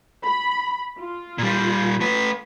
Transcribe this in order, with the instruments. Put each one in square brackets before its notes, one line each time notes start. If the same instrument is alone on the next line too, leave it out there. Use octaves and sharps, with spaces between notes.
[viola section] B5
F4
[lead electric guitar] A#2 G3
A3 B4